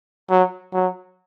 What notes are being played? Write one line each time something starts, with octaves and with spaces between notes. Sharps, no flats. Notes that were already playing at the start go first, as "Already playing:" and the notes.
F#3
F#3